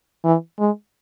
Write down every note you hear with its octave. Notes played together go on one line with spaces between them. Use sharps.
E3
G#3